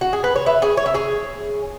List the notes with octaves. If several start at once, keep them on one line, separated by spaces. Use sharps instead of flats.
F#4
G#4
B4
C#5
B4 E5
G#4 C#5
C#5
E5
G#4 C#5